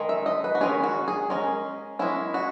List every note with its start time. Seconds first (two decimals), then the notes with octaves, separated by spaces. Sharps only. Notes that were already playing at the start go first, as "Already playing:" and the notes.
Already playing: D#3 G#3
0.09 E5
0.26 D#5
0.44 B4
0.55 F#4
0.61 D#3 G#3 C#4 G#4
0.84 F#4
1.08 G#4
1.30 G#3 C#4 A#4
1.99 G#3 C#4 E4
2.34 F#4